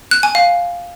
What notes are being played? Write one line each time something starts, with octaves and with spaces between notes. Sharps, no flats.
F#6
G#5
F5